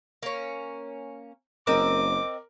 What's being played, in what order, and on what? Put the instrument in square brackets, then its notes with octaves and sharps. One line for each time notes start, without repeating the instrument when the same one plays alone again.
[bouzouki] A#3 C#4
[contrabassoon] F#1 [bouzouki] C4 D#5 [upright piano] A#4 [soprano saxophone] D6